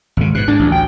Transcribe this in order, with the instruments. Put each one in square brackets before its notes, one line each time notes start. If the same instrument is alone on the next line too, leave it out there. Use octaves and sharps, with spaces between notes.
[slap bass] G#1 C#3
[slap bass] G#2 B2 [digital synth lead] F#6
[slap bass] G#2 [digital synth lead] D4
[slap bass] A1 D2
[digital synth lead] G5